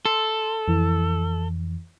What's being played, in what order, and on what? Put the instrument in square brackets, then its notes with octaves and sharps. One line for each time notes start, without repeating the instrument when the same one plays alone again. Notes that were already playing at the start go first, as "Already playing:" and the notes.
[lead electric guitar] A4 [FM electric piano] C6
[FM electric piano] F2 E3